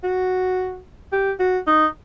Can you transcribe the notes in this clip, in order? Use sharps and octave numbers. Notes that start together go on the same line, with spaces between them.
F#4
G4
F#4
D#4